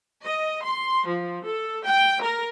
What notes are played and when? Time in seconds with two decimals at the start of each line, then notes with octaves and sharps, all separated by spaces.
0.23 D#5
0.64 C6
1.07 F3
1.47 A4
1.83 G5
2.20 A#4